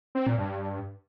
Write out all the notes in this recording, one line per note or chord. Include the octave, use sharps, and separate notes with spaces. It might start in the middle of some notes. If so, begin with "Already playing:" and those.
C4
A#2
G2